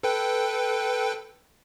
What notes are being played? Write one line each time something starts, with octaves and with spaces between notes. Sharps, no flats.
A4 B4 G5